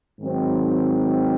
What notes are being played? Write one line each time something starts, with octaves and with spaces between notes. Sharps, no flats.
G#2 D#3 F#3 C4